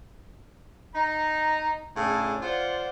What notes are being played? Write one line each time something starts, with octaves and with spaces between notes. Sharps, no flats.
D#4 A#5
A2 C#3 D4 G#4 A4
F4 C5 D5 F5 F#5